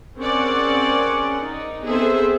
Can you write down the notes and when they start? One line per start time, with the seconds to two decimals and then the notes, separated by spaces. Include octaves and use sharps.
0.19 C4 C#4 G#4 A#4 D5 F#5
1.40 D#4
1.86 B3 C4 G#4 A4 C5 E5